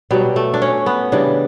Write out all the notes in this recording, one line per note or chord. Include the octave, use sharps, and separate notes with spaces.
B2 F#3 G3
A3
D4
C#4
B3
C#3 E3 G3 D4